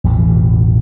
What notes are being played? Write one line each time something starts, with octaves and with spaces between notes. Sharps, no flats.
A1 E2 B2 E3